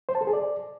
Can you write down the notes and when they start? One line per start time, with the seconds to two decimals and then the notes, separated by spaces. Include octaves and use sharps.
0.09 C5
0.15 A5
0.21 A4
0.27 G#4
0.33 D5